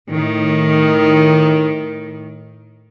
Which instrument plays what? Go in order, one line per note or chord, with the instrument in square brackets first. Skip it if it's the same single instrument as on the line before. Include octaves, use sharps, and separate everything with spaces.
[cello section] A2 D#3